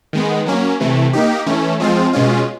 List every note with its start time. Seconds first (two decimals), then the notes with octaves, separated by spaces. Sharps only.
0.13 D#3 G#3 B3
0.46 F#3 A#3 C#4
0.80 C3 E3 A3
1.13 A#3 D#4 G4
1.46 E3 A3 C#4
1.80 F3 G#3 C4 F4
2.13 B2 G#3 C#4 F4